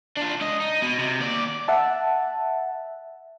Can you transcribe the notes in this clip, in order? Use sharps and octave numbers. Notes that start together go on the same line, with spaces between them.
D4 F4
C#2 D#5
D#4
B2
C3
D#2 D5
E5 F#5 A5